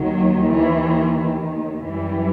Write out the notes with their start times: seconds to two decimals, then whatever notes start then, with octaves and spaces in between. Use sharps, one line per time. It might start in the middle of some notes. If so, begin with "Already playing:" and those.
Already playing: D#2 D#3 F#3
0.53 E3
1.90 F#2 E3 G3